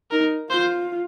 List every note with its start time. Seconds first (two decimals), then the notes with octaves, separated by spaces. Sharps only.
0.11 D#4 A#4
0.50 F4 C5